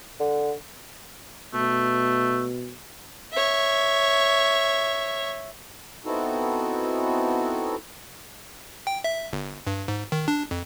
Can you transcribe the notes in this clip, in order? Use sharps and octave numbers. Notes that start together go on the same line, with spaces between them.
D3
B2 A3
C#5 E5
B3 C4 D#4 E4 F#4 A4
G5
E5
G1
G2
G#2
D#3
D4
F2